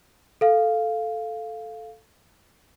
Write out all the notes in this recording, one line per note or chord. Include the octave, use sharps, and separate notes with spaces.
A4 F5